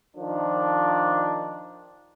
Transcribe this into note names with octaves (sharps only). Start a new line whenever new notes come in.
D#3 F3 D4